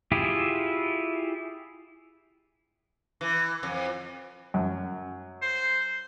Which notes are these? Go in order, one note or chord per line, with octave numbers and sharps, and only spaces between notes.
E4 F4 G4 G#4
E3
F2
F#2
C5